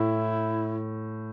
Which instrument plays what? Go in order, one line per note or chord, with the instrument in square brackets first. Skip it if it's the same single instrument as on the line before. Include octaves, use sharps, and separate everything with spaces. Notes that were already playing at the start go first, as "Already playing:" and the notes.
Already playing: [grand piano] A2 [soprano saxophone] E4